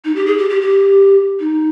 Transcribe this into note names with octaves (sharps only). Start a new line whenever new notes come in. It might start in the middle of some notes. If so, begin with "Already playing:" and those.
D#4
G4
G#4
G4
G4
G4
D#4